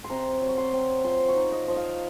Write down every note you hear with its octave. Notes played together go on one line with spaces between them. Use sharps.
C6
C3 A#5
F#3
C#6
C6
C4
F3 C6
C#6
D#4
D#5
F3
F5